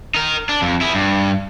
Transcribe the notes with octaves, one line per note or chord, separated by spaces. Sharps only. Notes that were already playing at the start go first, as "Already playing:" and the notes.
D#4 A#4
D4
F2
E4 G#4
G2